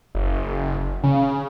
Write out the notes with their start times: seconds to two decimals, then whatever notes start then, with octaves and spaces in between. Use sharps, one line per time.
0.15 F#1
1.03 C#3